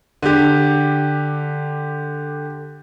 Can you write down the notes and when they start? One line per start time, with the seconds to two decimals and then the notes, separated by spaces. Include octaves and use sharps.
0.22 D3 G4